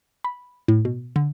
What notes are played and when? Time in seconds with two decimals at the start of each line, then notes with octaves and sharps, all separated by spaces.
0.24 B5
0.68 A2
0.85 B2
1.16 D3